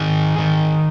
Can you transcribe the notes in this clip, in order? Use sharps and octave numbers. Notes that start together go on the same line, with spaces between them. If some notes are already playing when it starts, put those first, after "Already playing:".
Already playing: D#3 G#4
D#3